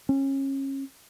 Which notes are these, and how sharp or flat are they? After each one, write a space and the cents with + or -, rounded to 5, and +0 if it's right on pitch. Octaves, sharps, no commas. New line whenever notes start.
C#4 -30